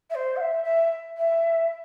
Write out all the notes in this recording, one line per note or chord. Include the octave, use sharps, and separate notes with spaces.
E5
C5
F#5
E5
E5
E5